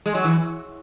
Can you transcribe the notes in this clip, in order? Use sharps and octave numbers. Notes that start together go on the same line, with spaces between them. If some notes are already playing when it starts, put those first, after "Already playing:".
G#3
F#3
E3